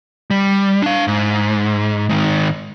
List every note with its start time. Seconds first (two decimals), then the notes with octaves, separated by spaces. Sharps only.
0.31 G3
0.82 D4 F5
1.08 G#2
2.09 G#2 D#3